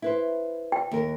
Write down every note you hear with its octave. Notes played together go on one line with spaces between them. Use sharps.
E4 B4 C5
G5
D#2 A#4